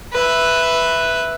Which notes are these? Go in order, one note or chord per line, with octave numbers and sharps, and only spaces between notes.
B4 E5